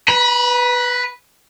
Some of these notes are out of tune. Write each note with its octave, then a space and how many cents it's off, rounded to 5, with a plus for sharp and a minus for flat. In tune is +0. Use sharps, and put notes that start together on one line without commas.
B4 +0 B5 -45